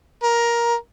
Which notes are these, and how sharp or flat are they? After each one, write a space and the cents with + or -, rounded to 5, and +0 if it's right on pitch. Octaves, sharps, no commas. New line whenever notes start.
A#4 +15